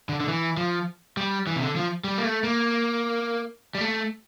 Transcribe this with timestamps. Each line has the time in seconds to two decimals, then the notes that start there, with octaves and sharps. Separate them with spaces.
0.09 D3
0.20 D3
0.28 E3
0.57 F3
1.17 G3
1.47 E3
1.56 C3
1.61 D3
1.76 F3
2.04 G3
2.18 A#3
2.25 A3
2.44 A#3
3.75 G3
3.81 A3